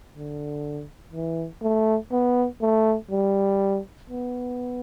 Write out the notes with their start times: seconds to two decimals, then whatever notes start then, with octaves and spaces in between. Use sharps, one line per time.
0.14 D3
1.12 E3
1.62 A3
2.12 B3
2.61 A3
3.11 G3
4.09 B3